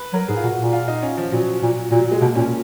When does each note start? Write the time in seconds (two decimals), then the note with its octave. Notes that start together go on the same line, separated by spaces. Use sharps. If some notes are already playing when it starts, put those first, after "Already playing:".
Already playing: B4
0.13 F#3 A#4
0.28 G#2 G#4
0.37 F4
0.43 A#2 F#4
0.58 A#2
0.73 F4
0.88 D#4
1.03 C#4
1.17 F3
1.32 A#2 F#3
1.62 A#2
1.91 A#2 F#3
2.01 F#3
2.12 G#3
2.21 B2 A#3
2.35 A#2 C#4